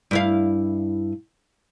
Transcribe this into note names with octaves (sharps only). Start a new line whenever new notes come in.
G2 E4 F5